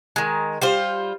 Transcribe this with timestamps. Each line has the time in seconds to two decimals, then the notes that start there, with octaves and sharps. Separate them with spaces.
0.16 D#3 G#3
0.62 G3 F4 C5